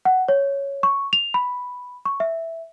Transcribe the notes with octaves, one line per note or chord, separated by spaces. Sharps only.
F#5
C#5
C#6
F7
B5
C#6
E5